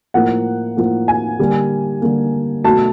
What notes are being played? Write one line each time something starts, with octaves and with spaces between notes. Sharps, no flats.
A2 F3 A#3 F#5
A2 F3 A#3
G#5
D3 G3 A#3
D3 G3 A#3
B2 F#3 A3 A5